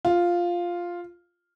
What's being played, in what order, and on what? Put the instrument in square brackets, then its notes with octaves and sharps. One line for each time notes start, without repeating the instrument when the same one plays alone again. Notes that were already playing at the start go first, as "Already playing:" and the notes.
[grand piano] F4